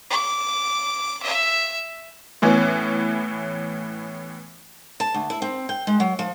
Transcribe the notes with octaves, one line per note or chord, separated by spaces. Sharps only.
D6
E5
A2 E3 B3 C#4
A5
D2
E4
C4
G5
G#3
F#3
F3